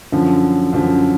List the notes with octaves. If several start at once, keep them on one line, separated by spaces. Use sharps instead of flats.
F#2 D3 F3
F#2 D3 F3